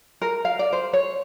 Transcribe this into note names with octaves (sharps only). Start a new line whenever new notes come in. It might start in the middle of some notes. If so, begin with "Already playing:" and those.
A#4
F5
D5
C5
C#5